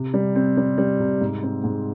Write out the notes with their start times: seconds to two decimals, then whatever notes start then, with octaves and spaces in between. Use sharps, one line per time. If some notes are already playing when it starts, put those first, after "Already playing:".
Already playing: C3
0.14 G3
0.36 C4
0.57 G3
0.78 G3
1.00 C3
1.21 G#2
1.43 C4
1.64 G#2